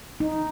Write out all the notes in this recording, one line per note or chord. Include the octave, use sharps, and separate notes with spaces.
D#4